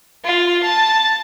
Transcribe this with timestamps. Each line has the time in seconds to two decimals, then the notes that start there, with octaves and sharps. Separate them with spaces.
0.23 F4
0.63 A5